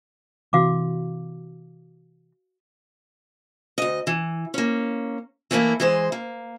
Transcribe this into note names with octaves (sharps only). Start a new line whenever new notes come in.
C3 E3 C4 F#4 F5 D6
D2 D#5
E3
A#3 C#4
E3 A3 A#3 E4
E3 G#3 C5
A#3